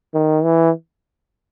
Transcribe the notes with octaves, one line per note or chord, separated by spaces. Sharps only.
D#3
E3